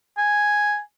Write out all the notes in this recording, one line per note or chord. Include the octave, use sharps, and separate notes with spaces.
G#5